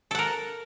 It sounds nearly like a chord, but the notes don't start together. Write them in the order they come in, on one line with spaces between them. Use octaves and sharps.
A4 F#5 A#4